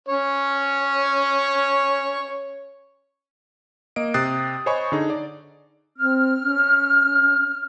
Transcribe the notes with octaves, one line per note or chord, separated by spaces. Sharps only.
C#4 C#5
A#3 D#5 D7
C3 G5 D#6 F#6 A6 C7
C5 C#5 D#5 G#5 B5 C#6
D3 D#4 G#4
D5
C4 F6
C#4